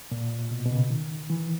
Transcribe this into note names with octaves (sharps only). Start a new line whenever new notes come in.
A#2
B2
B2
C#3
D#3
E3